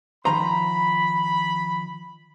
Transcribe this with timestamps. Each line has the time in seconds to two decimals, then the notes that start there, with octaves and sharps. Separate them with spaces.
0.25 D#3 F3 C5 A#5 B5